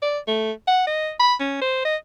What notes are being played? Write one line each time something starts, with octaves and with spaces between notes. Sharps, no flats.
D5
A3
F#5
D#5
B5
C#4
C5
D#5